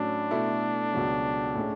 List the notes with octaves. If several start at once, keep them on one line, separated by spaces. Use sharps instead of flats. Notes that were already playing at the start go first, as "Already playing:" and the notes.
Already playing: A2 F#3 C#4 D4
B2 A3 E4
C#2 B2 F#3
A2 G#3 C#4